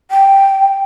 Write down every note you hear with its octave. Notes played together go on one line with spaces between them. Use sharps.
G5